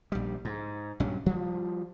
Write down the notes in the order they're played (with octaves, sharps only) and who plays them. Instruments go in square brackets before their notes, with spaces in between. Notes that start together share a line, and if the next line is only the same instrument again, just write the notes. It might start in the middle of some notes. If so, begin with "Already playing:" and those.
[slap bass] A#1 G3
G#2
A#1 G2 F#3 C#4
F3 G3